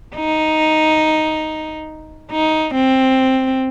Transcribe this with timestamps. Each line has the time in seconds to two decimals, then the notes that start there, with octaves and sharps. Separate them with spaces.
0.16 D#4
2.32 D#4
2.75 C4